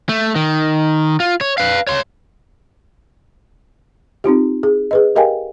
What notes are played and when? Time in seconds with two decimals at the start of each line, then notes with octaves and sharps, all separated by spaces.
0.09 A3
0.36 D#3
1.20 F4
1.41 C#5
1.58 B4 F5
1.87 C#5 C6
4.24 C4 D#4 F4 G4
4.63 G#4
4.91 G#4 B4 D#5
5.16 G4 A#4 D#5 F5 G5 G#5